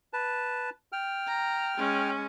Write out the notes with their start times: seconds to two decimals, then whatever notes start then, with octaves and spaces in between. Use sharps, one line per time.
0.13 B4 A5
0.92 G5 F6
1.27 A#5
1.77 G#3 C#4